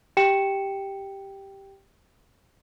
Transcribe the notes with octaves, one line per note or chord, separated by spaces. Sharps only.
G4 G5 C#7 E7